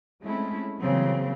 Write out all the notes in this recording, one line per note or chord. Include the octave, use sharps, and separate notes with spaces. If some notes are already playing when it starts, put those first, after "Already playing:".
G#3 A3 C4 C#4 E4
C#3 E3 F#3 G3 A#3 C4